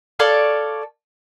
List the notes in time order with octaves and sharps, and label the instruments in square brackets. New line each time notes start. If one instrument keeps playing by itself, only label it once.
[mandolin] A4 C#5 D5 F5